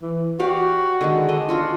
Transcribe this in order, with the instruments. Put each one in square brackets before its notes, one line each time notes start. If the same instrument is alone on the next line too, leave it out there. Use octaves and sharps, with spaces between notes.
[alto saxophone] E3
[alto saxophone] F#4 [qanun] G4 D5 F5
[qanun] D3 D#3 G#3
[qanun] D4 D#5 [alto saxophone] A4
[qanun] D4 F4 F#4